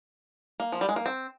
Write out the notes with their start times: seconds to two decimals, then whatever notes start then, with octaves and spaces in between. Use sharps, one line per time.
0.60 A#3
0.72 F3
0.81 G3
0.89 G#3
0.96 A#3
1.06 C4